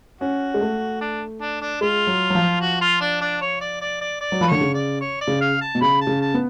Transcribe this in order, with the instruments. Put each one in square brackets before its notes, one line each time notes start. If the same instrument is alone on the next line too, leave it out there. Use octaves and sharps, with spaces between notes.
[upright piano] C#4 [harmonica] F#4
[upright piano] G#3
A3
[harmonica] D4
D4
D4
[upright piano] G#3 [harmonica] F4
[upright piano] F#3
F#3
F3
[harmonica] F#4
F4
D4
D4
C#5
D5
D5
D5
D5
[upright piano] F#3
[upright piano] F3 [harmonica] B4
[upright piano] D3 [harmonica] C#5
[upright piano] C#3
[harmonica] D5
C#5
D5
[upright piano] C#3
[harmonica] F5
A5
[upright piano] B2
[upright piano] C#3 [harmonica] B5
[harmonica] A5
[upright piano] C#3
[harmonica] A5
[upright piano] B3